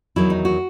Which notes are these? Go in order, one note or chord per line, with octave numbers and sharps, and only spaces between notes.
E2 D#3 F#3 E4
D#4
F#4